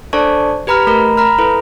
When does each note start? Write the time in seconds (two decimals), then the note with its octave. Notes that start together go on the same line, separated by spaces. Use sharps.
0.13 D4 A4 C5 D5 A5 C#6
0.67 G4 B4 A#5 B5 F6
0.87 A3 A#4 A#5 B5
1.17 A#5 B5 F6
1.38 E4 A4 B4